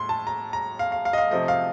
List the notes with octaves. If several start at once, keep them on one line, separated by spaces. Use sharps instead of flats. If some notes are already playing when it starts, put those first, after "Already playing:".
Already playing: A2 C6
A5
A#5
A#5
F5
F5
F5
D#5
F5
C3 F3 A3 D#5
F5